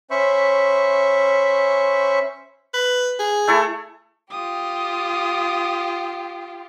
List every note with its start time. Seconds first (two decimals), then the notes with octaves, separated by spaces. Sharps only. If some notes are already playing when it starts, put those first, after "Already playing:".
0.11 C#4 C5 E5 B5 C#6
2.74 B4
3.19 G#4
3.48 A3 E4 A4
4.30 F4 G4 D#6